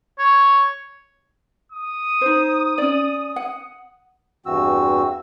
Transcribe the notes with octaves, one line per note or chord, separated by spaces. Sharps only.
C#5
D#6
D#4 C5
C#4 D5
F#5
E2 G2 E3 C4 F#4 E6